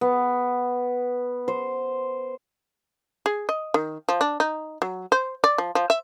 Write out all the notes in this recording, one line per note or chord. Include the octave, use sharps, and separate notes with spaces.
B3
C5
G#4
D#5
D#3
F3
D4
D#4
F#3
C5
D5
F3
F3
E5